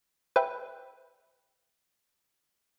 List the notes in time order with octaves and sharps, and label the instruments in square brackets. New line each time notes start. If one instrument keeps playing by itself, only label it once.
[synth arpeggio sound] B4 C5 E5 G5